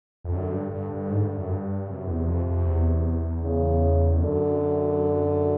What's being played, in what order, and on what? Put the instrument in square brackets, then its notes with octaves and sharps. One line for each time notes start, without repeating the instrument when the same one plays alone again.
[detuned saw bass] F2
[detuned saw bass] F#2 [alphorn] D3
[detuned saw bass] G2
G2
G2
G#2
G2
F#2
G2
[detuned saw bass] F#2 [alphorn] C3
[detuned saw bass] E2
F2
F2
E2
[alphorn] C#3
[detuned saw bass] F#2 [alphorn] D3